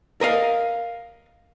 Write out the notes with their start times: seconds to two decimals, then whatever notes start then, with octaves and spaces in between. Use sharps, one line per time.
0.21 A#4 D#5 F5